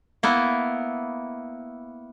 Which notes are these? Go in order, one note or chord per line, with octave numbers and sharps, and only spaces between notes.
A#3 B3 E4